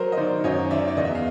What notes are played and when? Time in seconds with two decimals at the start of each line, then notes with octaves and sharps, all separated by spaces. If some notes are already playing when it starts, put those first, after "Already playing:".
Already playing: F#3 A#4 C5
0.12 D#5
0.17 D#3 C5 D5
0.44 F#2 C#5 D#5
0.70 D#3 D5 E5
0.88 D5
0.97 E2 D#5
1.05 E5
1.15 F5